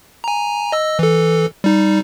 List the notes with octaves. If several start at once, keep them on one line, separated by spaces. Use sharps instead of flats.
G#5 A#5
D#5 E6
E3 A4
G3 D#4